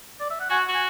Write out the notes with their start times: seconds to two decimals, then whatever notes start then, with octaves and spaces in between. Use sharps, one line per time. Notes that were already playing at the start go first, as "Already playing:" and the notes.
0.20 D5
0.30 E5
0.40 F#5
0.50 F#4 G#5
0.66 F#4
0.74 G#5